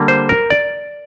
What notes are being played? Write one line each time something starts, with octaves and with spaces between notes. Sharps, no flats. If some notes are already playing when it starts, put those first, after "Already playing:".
Already playing: D3 G3 A#3
C5
A#4
D5